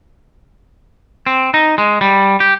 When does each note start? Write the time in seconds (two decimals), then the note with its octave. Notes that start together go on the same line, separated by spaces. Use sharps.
1.26 C4
1.54 D#4
1.78 G#3
2.01 G3
2.40 G4